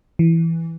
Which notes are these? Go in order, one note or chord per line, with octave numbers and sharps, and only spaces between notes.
E3